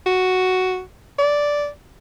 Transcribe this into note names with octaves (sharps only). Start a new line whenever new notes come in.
F#4
D5